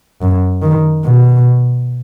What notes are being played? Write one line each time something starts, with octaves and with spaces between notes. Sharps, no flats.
F#2
D#3
B2